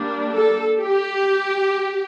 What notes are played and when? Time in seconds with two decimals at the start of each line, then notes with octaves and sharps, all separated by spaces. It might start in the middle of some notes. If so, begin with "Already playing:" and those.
Already playing: G3 A#3 D4
0.30 A4
0.79 G4